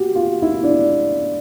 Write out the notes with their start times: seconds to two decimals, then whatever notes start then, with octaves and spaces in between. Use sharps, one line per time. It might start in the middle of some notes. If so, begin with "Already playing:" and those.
Already playing: F#4 G4
0.15 F4
0.42 E4
0.63 D4